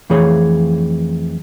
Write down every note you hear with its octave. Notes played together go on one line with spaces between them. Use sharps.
F2 E3 A3 G#4 C#5 F5